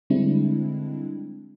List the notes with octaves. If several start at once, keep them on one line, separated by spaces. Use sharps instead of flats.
D3 G3 G#3 C4 D4 E4